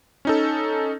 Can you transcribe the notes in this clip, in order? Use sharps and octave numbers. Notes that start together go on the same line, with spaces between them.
C#4 D#4 A4